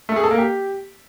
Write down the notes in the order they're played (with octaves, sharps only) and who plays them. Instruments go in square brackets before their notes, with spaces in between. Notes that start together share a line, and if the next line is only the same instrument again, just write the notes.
[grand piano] A3
G#4
A4
A#3
G4